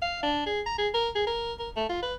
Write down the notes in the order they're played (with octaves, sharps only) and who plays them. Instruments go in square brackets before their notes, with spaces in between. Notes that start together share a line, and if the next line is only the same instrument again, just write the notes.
[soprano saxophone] F5
D4
G#4
A#5
G#4
A#4
G#4
A#4
A#4
A3
F4
B4